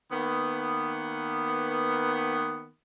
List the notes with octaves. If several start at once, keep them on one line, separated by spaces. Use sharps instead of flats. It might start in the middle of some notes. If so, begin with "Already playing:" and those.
D#3 A#3 B3